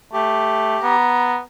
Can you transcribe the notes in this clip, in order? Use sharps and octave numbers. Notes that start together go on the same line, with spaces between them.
A3 G4
B3 A#5